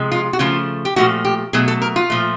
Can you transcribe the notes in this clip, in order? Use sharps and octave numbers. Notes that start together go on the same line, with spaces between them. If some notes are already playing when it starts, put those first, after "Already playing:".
Already playing: C3 F3 G#3
F4
F#4
C#3 F3 A3 F4
G4
A#2 F3 A3 F#4
G4
B2 F#3 A3 G#4
A4
A#4
F4
A#2 F3 A3